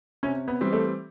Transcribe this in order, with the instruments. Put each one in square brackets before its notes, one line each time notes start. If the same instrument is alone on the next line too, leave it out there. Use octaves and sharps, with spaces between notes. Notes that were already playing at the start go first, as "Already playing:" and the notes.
[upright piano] C3 [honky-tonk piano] C#4
[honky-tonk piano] B3
[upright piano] E3 G3 C4
[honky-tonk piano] A3